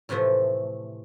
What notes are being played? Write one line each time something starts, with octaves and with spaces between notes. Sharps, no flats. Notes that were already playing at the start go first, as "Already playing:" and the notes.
A2 C3 E3 F3 A3